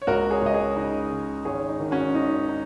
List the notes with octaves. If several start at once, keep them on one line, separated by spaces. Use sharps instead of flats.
C#5
C#2 F#4 A#4
G#4 C#5
C#2 D#5
G#4 C#5
C#3 D#4
C#3
G#1 G#4 C#5
D#4
D#3
C#4 F#4
G#1 D#4
D#4